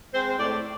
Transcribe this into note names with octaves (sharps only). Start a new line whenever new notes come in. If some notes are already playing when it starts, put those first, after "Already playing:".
G#3 C4 C5
A2 D5